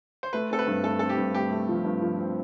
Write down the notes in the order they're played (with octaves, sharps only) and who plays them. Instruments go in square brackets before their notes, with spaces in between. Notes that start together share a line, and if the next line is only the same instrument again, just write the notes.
[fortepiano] C5
[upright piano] A3 [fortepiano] B4
[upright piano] C4 [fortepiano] A4
[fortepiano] B4
[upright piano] G2
[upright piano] A3 [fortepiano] A4
[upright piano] C4 [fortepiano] A4
[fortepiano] G4
[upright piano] G2
[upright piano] A3 [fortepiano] G4
[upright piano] A3
F3
G2
F3
C4